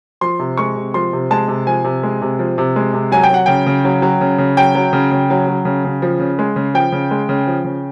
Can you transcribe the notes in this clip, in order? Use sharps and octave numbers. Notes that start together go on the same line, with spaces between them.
F3 C6
C3
G#3 C#6
C3
F3 C6
C3
G#3 A5
C3
F3 G#5
C3
G#3
C3
F3
C3
G#3
C3
F#3 G#5
G5
F#3 F#5
C#3 G5
C#3
F#3
F#3
C#3
C#3
F#3 G5
F#3
C#3
C#3
F#3
F#3
C#3
C#3
F3
C#3
G#3
C#3
F3 G5
C#3
G#3
C#3
F3
C#3